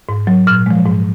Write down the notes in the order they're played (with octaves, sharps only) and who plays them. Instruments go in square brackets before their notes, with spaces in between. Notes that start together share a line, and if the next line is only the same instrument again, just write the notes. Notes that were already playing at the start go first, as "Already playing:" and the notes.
[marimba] G#2
F#3
A#2 F6
F3 G#3
G#2